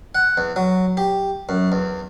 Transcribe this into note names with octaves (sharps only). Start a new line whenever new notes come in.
F#5
E2
F#3
G4
F#2
E2